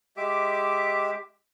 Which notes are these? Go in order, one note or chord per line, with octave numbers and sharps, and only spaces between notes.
G#3 G4 E5 D6